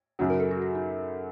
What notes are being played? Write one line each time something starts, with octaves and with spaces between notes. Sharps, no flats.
F#2 C#3 F#3 D#4
A#4
A4
F#4
F#4
D#4